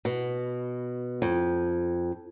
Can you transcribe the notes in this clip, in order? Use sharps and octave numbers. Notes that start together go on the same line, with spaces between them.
B2
F2